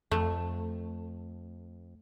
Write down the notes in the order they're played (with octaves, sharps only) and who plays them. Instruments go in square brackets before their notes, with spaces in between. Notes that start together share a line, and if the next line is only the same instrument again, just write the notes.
[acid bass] F2 [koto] A3